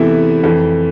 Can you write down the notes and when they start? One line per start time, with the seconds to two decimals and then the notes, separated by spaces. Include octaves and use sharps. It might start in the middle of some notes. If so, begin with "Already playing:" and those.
Already playing: E2 C3 E3 A3 E4
0.44 F2 E3 A3